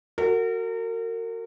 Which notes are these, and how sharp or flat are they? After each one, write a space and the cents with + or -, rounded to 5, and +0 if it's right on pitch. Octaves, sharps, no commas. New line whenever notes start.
F#4 +0 A#4 -35